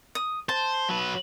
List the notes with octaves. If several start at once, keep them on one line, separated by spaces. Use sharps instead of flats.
D#6
C5 A5
F#3 B4